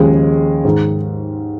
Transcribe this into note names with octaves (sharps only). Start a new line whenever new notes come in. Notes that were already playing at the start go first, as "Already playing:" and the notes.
Already playing: D#2 C#3 F3 G#3
G#2 D#3